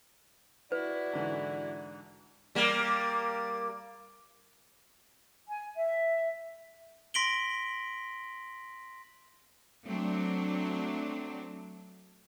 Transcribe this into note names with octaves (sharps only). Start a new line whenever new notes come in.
E4 F#4 B4 D5
G#2 D3 E3
G3 A#3
G#5
E5
C6 A#6 B6 D7 F#7 G7
F#3 A3 C4 D4